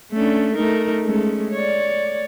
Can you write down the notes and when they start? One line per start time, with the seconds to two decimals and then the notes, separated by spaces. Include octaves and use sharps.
0.12 A3 C#4 D4
0.55 A3 D#4 A#4
1.04 G#3 A3 C#4
1.52 C#5 D5